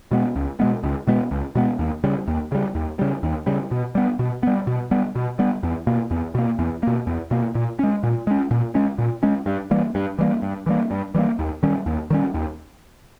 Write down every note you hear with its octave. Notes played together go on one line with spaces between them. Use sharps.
B2 G#3 B3
C#2
B2 G#3 B3
C#2
B2 G#3 B3
C#2
B2 G#3 B3
D#2
C#3 G3
D#2
C#3 G3
D#2
C#3 G3
D#2
C#3 G3
B2
G3 B3
B2
G3 B3
B2
G3 B3
B2
G3 B3
E2
B2 A#3
E2
B2 A#3
E2
B2 A#3
E2
B2 A#3
A#2
G#3 C#4
A#2
G#3 C#4
A#2
G#3 C#4
A#2
G#3 C#4
G2
E3 G3 A#3
G2
E3 G3 A#3
G2
E3 G3 A#3
G2
E3 G3 A#3
D#2
D#3 G3 C#4
D#2
D#3 G3 C#4
D#2